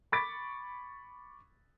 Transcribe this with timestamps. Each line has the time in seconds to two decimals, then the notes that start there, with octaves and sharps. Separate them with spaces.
0.12 B5 C#6 D6 A6 B6 D7